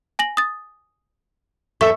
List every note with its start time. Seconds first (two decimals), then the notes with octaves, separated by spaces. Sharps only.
0.19 G#5 A#6 F#7
0.37 D#6 A6
1.81 E2 A4 E5 C#6 E6